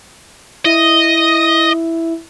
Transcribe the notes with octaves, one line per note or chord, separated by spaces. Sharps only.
E4 D#5